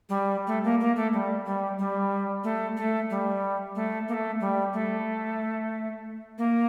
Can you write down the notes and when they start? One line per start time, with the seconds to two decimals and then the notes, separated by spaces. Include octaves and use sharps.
0.09 G3
0.47 A3
0.64 A#3
0.80 A#3
0.96 A3
1.13 G3
1.45 G3
1.79 G3
2.44 A3
2.77 A3
3.10 G3
3.75 A3
4.08 A#3
4.13 A3
4.41 G3
4.73 A3
6.38 A#3